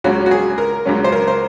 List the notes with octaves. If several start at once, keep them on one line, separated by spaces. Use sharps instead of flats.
C#2 C#3 F#3 C#4 F#4
F#4
G#4
A#4
C#2 C#3 F#3 C#4
C5
A#4
C5